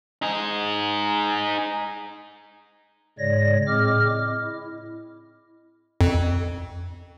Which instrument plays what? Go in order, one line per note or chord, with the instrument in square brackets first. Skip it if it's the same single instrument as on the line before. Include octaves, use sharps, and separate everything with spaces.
[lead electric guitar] D#4 G#4
[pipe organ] G#2 C#3 G#3 C#5 D5 A#6
A2 C4 G#4 D#5 D6 F6
D#5
E4
[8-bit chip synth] F2